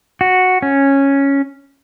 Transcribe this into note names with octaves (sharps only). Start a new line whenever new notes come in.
F#4
C#4